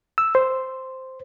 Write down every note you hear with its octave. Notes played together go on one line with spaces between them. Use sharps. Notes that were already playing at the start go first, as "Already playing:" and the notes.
E6
C5